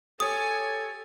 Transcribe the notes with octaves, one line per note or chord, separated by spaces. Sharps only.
G4 A4 C#5 G#5 D#6